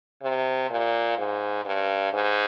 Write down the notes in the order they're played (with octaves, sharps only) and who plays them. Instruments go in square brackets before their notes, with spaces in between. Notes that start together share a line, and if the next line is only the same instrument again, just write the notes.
[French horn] C3
A#2
G#2
G2
G#2